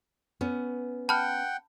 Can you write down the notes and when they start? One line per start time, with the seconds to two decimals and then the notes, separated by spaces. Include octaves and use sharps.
0.41 B3 C#4
1.09 F#5 G5 A5 B5 F6